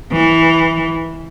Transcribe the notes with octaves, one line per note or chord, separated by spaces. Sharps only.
E3